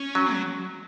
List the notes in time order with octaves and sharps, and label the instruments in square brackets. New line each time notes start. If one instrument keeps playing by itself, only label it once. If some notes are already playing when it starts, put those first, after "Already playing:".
Already playing: [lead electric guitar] C#4
[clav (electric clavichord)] F#3
[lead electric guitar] F#3